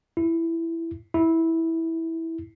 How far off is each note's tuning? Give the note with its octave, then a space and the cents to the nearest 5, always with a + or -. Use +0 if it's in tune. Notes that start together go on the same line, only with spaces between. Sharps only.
E4 +10
E4 -10